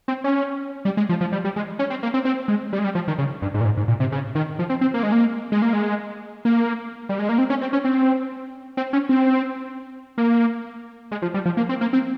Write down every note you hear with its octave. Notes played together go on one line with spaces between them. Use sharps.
C4
C#4
G3
G#3
F3
F3
G3
G3
G#3
C#4
C4
A#3
C4
C4
G#3
G3
G#3
G3
F3
D#3
C#3
G2
G#2
A#2
G#2
G#2
A#2
C3
C#3
D#3
F3
C4
C4
A#3
G#3
A#3
G#3
A#3
G#3
A#3
G3
G#3
A#3
C4
C#4
C4
C#4
C4
C4
C#4
C4
A#3
G#3
F3
G3
F3
A#3
C4
A#3
C4